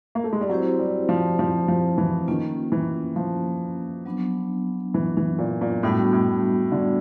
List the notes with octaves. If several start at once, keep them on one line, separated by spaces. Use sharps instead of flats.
A#3
A3
G#3
G3
F#3 C4 E4 G4 C5
G3
F3
F3
F3
E3
D#3 A#3 C#4 F4
E3
F3
F#3 B3 D4
E3
E3
A#2
A#2
A2 G3 B3 D4 F#4
A2
D3